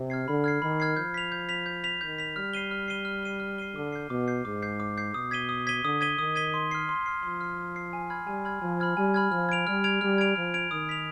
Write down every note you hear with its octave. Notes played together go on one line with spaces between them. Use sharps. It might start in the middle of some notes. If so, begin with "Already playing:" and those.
Already playing: C3
F6 G#6 C7
D3 B5
F6 G#6 C7
D#3 B5
F6 G#6 C7
F3 G6
B6 F7
G6
B6 F7
G6
B6 F7
D#3 G6
B6 F7
G3 F6
C7 D#7 G7
F6
C7 D#7 G7
F6
C7 D#7 G7
F6
C7 D#7 G7
D3 D6
G6 C7
B2 D6
G6 C7
G#2 D6
G6 C7
D6
G6 C7
B2 D#6
G#6 B6 D#7 G7
D#6
G#6 B6 D#7 G7
D3 D#6
G#6 B6 D#7 G7
D#3 D#6
G#6 B6 D#7 G7
C6
F6 C7
C6
F6 C7
F3 C6
F6 C7
C6
F6 C7
G#5
B5 F6 G#6
G3 G#5
B5 F6 G#6
F3 G#5
B5 F6 G#6
G3 G#5
B5 F6 G#6
F3 F6
G#6 D7 F7
G3 F6
G#6 D7 F7
G3 F6
G#6 D7 F7
F3 F6
G#6 D7 F7
D#3 D#6
B6 F7